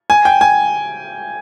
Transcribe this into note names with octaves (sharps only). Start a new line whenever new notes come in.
G#5
G5
G#5